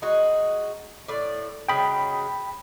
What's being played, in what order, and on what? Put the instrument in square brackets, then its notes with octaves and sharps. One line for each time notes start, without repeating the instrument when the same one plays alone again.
[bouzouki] G#3 D#4 F#4
A2 D5
[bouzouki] C#3 F#3 D#4 [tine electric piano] G5 B5